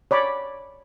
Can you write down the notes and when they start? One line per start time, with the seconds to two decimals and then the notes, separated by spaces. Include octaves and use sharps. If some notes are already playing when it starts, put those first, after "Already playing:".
0.11 C#5 D5 B5 D6